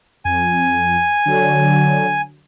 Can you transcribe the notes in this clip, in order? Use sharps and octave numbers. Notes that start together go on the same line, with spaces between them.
F2 G#5
D3 F#3